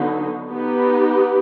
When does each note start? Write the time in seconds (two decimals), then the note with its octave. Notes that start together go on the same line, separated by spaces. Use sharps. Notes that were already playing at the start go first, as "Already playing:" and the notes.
Already playing: D3 F#3 B3 D#4
0.50 B3 D#4 G4 B4